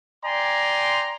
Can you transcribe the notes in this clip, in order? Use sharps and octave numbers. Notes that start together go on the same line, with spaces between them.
D5 G5 G#5 A#5 C6